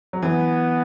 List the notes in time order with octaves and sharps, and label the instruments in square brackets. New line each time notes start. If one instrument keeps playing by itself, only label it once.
[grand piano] F#3
[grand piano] E3 [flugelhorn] B3